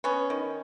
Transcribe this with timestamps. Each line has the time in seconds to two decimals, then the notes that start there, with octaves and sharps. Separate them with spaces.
0.04 B3 C#4
0.30 D#3